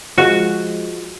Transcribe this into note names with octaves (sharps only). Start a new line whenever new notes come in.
F3 G#3 F#4